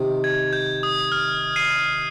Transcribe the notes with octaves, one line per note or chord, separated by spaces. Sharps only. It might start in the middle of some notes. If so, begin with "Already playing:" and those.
Already playing: C3 D#3
G#6
G6
D#6
F6
C7 D#7